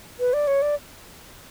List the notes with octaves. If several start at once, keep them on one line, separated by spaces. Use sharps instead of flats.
B4
D5
C#5
D5